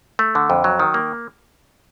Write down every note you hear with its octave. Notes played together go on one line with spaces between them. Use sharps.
A3
D3
F2
F#3
D#3
A#3